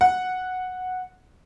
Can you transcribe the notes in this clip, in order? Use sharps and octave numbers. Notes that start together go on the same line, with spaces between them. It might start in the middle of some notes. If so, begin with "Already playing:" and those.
F#5